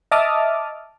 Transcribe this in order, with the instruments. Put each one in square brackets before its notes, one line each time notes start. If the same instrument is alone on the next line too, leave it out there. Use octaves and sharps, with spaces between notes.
[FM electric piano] D#5 E5 A5 D6 D#6 F6